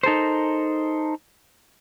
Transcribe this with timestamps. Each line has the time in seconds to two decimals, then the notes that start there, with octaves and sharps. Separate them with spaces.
0.03 D#4 A4 A#4 C5